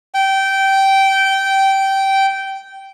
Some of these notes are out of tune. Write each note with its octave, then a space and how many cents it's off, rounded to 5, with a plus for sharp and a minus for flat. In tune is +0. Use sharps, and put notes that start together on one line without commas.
G5 -15